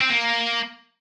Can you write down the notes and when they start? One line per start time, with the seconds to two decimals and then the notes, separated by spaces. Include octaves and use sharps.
0.01 C4
0.10 A#3